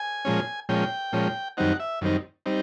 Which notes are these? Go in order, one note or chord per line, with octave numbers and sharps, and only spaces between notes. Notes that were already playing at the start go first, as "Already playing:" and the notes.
Already playing: G#5
A#2 F3 G#3 C#4
A#2 F3 G#3 C#4 G5
A#2 F3 G#3 C#4
F#2 D#3 G3 C4 D#4 F#5
E5
F#2 D#3 G3 C4 D#4
G3 C4 D#4